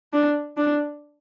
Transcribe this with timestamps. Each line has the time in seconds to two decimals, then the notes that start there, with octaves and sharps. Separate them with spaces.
0.13 D4
0.57 D4